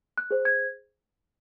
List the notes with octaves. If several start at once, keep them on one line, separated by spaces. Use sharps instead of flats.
F#6
G#4 C5
G#6